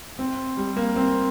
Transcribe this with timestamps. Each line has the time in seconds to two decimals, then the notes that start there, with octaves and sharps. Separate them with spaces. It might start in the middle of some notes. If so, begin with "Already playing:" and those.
0.19 C4
0.57 G3
0.77 A#3
0.96 C4